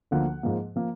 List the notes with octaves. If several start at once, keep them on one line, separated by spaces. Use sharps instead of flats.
D2 D3 F3 A#3 F#5
G#2 F3 A#3
F3 A#3